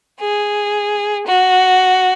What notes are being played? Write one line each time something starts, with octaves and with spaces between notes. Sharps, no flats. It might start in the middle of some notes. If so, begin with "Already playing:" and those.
G#4
F#4